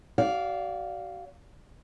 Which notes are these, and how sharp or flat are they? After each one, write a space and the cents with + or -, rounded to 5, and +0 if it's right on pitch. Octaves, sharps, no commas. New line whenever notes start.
F#4 +40 D5 -20 F5 +0